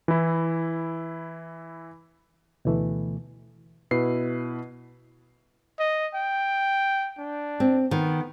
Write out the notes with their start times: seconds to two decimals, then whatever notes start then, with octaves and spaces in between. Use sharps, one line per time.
0.08 E3 E4
2.65 D2 B2 E3 A3
3.91 B2 E4 B4 C7
5.79 D#5
6.15 G5
7.18 D4
7.60 C4
7.91 D#3 B3